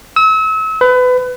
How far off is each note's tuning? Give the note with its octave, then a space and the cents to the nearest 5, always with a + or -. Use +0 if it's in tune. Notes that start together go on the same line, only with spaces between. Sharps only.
E6 -35
B4 +25